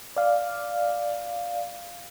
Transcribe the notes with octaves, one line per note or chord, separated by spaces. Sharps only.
D5 F5